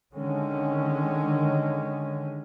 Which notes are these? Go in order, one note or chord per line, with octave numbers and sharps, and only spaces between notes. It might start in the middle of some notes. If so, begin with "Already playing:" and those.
D3 D#3 G#3 C#4